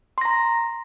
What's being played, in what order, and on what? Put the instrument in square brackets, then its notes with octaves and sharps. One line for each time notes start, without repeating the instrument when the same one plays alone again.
[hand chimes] C6
A#6
A#5